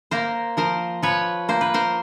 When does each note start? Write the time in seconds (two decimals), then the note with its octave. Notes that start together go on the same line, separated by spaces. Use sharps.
0.11 A#3 A#4 C5
0.57 F3 A#4 C5
1.03 F3 B4 C#5
1.49 A#3 C5
1.61 B4
1.74 A#4 C5